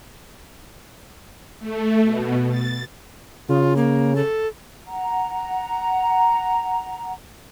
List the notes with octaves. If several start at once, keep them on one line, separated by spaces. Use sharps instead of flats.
A3
B2
A6
C#3 F4
A#3
A4
F#5 A#5